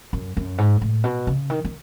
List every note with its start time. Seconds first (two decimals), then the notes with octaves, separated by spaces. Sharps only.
0.13 F#2
0.37 F#2
0.58 G#2
0.81 A2
1.04 B2
1.27 C#3
1.50 D#3
1.65 D#3